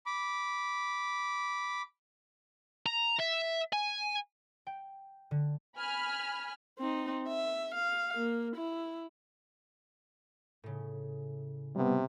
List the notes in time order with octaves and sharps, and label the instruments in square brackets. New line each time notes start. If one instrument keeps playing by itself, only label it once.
[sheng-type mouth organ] B5 D6
[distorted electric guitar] A#5
E5
G#5
[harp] G5
D3
[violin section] G#5 B5 F6
[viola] C4 D#4
E5
F5
A#3
E4
[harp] A2 C#3
[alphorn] C3 [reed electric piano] G3 B3